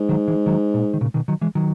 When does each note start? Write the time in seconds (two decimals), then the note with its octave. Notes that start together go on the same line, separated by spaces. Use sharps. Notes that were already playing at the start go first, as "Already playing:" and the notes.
Already playing: G#2
0.09 D#3 F#3
0.27 E3 G#3
0.46 D#3 F#3
0.74 A#2
0.94 D#3
1.01 A#2 C#3
1.14 B2 D#3
1.28 D#3 F#3
1.42 E3 G#3
1.55 D#3 F#3